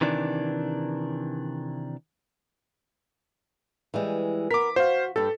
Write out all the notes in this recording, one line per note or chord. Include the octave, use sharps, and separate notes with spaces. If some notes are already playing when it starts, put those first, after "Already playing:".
C3 D#3 E3 D4
E3 G3 G#3
B3 A#4 D6 B6
F#4 C5 F5
G2 G4 A4